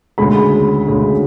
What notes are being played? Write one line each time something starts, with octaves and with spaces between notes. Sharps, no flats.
D2 C#3 G#3 B5
D2 C#3 G#3